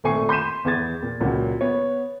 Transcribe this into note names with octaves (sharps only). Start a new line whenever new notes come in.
G#1 A#2 A3 G#5 C#6 C7
C6 G6 B6 D#7 E7
E2 B3 G#4 G#6 A6
A#2
C#2 A#2 F#3
B3 C#5